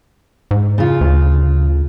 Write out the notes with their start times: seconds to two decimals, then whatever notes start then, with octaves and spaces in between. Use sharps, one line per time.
0.51 G#2
0.78 C#3 F4
1.01 D2